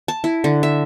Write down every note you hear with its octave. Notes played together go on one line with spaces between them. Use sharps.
A5
E4
D3
E5